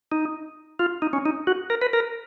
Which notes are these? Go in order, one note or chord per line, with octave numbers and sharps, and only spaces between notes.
D#4
F4
D#4
C#4
D#4
F#4
A#4
B4
A#4